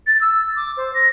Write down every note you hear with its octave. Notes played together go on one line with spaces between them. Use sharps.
A6
E6
D6
C5
A#6